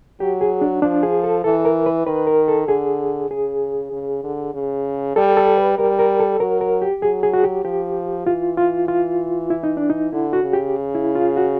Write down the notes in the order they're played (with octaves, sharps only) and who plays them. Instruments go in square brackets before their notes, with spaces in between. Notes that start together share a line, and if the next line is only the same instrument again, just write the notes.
[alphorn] F#3 [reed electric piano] G4
[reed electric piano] G#4
D4
[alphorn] F3 [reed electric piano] D4
[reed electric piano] G#4
A4
[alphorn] E3 [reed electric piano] A4
[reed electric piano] A#4
B4
[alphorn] D#3 [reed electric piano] B4
[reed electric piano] A#4
A4
[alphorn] D3 [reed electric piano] G#4
[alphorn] C#3 [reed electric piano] G#4
[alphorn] C#3
D3
C#3
[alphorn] G3 [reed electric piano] A4
[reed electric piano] A4
B4
[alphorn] G3 [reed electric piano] A#4
[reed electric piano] A#4
A4
[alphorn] F#3 [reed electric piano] A#4
[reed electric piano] A#4
G4
[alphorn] F#3 [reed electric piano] G#4
[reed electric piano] G#4
F#4
G4
[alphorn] F3 [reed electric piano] G4
[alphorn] E3 [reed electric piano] F4
[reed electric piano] F4
F4
E4
D#4
D4
D#4
[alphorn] D3 [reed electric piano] E4
[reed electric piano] F#4
[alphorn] C#3
[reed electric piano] G4
E4
F4
F#4